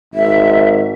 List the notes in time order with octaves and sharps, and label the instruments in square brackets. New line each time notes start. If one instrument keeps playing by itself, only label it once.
[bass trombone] G#1 [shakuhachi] E5